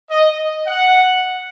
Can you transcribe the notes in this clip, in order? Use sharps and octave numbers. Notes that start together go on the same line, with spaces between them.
D#5
F#5